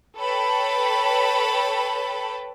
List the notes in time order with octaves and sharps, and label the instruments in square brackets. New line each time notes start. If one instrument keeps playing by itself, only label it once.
[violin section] A4 B4 C#5 G5 A5 B5